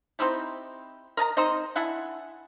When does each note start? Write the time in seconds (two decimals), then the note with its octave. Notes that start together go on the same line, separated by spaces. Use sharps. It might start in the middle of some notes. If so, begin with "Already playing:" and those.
0.19 C4 D#4 E4 G4
1.17 A#4 D#5 A5 A#5
1.37 C4 D#4 C5 D#5
1.75 D4 E4 F#5 G#5